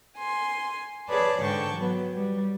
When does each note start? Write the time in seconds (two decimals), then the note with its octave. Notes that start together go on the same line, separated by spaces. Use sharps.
0.18 G#5 C6
1.08 G#4 B4 C#5 D5 A5 B5
1.43 G#2 D3 G5 A5 C#6
1.77 F#3 B3
2.15 G3